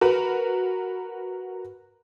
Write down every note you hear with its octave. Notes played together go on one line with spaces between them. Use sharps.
F#4 A#4 B4